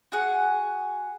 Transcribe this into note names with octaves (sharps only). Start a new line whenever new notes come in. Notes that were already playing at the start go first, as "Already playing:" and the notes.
F#4 G#4 F#5 G#5